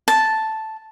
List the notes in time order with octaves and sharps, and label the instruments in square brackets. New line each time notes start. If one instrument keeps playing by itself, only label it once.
[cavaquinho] A5